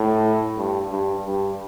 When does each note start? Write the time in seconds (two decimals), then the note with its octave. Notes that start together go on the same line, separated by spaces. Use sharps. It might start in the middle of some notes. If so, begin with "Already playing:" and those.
Already playing: A2
0.58 G2
0.92 G2
1.27 G2